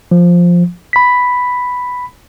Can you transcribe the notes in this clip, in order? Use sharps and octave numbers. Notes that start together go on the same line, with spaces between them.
F3
B5 B6